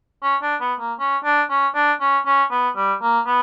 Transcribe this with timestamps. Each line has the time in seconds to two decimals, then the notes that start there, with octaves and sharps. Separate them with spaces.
0.23 C#4
0.42 D4
0.61 B3
0.80 A#3
0.99 C#4
1.25 D4
1.50 C#4
1.75 D4
2.01 C#4
2.26 C#4
2.51 B3
2.76 G3
3.02 A#3
3.27 B3